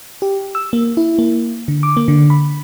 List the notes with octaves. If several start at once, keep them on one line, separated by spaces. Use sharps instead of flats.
G4
E6
A#3
E4
A#3
D3
D6
A#3
D3
B5